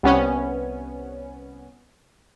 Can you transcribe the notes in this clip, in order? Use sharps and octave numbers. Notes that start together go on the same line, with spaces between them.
C2 B3 C#4